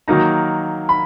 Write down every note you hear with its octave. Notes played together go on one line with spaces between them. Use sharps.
D#3 F#3 A#3 D#4 A#5
B5